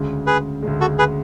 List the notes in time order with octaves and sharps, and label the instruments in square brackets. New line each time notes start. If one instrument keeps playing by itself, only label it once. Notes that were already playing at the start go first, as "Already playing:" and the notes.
Already playing: [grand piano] D2 C#3 G#3
[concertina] G#4 B4
[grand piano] D2 C#3 G#3
[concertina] F#4 A4
G#4 B4